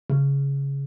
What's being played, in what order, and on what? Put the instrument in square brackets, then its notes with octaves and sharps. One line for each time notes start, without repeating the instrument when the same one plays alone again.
[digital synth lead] C#3